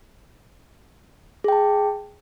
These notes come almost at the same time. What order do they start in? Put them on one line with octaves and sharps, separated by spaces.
G#4 G5 A5